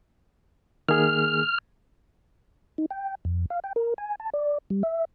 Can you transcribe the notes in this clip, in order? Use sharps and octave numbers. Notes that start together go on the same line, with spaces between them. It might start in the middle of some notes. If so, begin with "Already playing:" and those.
D#3 A#3 G#4 F6
D#4
G5
F2
F5
G5
A#4
G#5
A5
D5
G3
E5